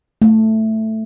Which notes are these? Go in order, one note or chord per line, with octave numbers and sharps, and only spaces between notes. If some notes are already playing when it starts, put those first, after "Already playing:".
A3